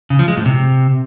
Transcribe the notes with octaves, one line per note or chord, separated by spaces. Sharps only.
C#3
F3
G#3
A2
C3